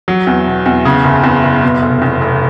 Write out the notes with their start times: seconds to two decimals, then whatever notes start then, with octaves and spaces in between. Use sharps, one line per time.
0.08 F#3
0.27 E2
0.46 B2
0.66 E2
0.85 C#3
1.04 F#1
1.24 E2
1.43 F#1
1.63 B2
1.82 F1
2.02 E2
2.21 F1